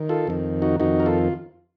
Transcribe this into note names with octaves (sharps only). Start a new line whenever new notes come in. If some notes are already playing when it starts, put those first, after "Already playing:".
Already playing: D#3
F4 A4
F2 D#3
D#4 F#4
F2 D#3 D#4 F#4
A#4
F4 A4